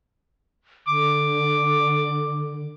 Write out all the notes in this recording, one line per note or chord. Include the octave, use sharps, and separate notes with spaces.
D3 D6